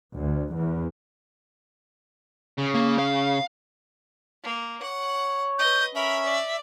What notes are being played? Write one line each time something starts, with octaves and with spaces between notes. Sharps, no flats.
D2
E2
C#3
A#3
F5
A#3
C#5 F#5
B4 D#5 G6
C#4 A#4 E5 B5
D5